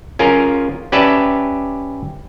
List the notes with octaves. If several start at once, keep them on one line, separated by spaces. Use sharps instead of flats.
C#4 F4 G#4 A#4
C#4 G4 B4 D5 E5 A5